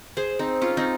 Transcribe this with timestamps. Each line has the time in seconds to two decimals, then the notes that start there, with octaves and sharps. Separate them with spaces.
0.17 G#4 C5
0.39 C4 D#4
0.62 C#4 F4
0.77 C4 D#4